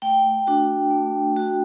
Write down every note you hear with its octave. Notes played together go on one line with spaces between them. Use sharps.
A3 G5
D4 F#4
A3
D4 F#4